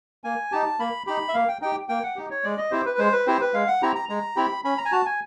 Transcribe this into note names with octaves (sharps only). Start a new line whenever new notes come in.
A#3 G#5
D#4 G4 A5
A#3 B5
D#4 G4 B5
E5
A#3 F5
G5
D#4 G4 G5
A#3 G5
F#5
D#4 G4
C#5
G#3 D5
D#5
C4 E4 G4 C5
B4
G#3 C5
B4
C4 E4 G4 C5
B4
G#3 F5
F#5
C4 E4 G4 A#5
A#5
G#3 A#5
C4 E4 G4 B5
C#4 B5
A#5
G#5
F#4 A5
G#5